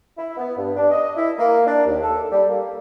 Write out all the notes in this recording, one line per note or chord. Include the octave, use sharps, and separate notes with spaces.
E4
B3
G2
D4
D#5
E4
A#3
D4
D#2
A4
G3
A#3